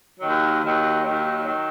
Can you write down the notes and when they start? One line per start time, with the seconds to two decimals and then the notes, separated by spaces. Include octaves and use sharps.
0.19 D#2 D#3 F#3
0.62 D#2 D#3 F#3
1.03 D#2 D#3 F#3
1.45 D#3 F#3